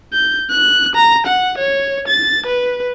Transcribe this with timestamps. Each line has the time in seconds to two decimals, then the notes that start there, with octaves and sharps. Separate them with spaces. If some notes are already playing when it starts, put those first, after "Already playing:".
0.13 G6
0.50 F#6
0.95 A#5
1.26 F#5
1.58 C#5
2.08 A6
2.46 B4